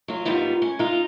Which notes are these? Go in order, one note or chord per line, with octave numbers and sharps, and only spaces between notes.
F#3 F4
G#2 D#3 G3 B3 F4
C#4
D#4 F4